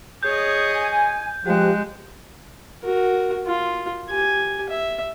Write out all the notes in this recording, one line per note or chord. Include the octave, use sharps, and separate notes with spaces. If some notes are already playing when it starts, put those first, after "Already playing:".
G#4 C#5 D#5 G6
G#5
F3 G#3 G4 F#6
F#4 A#4
F4
G4 G#5
E5